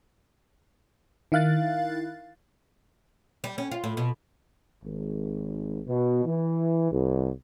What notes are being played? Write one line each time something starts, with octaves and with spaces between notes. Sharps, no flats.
D#3 E4 F5 F#6 A6
G3
C#4
F4
A2
B2
G#1
B2
E3
C2